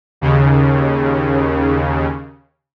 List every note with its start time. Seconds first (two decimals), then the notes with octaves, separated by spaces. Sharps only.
0.21 D#2 C#3